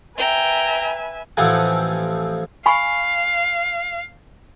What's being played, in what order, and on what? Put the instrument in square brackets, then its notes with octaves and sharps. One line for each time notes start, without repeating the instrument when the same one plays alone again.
[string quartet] B4 E5 G#5 [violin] G5 A#5
[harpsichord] A1 F3 C4 A4 F#5 G#5
[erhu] F5 [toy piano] G#5 B5 C#6